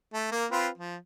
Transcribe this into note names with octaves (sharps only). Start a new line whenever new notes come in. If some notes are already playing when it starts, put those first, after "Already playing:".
A3
A#3 A#4
C4 F4 B4
F3